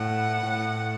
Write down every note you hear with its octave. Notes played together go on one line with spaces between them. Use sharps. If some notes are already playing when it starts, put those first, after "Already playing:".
Already playing: A2 F#5
A2